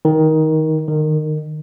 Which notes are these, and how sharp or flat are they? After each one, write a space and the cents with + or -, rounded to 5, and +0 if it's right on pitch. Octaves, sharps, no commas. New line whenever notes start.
D#3 +15
D#3 -20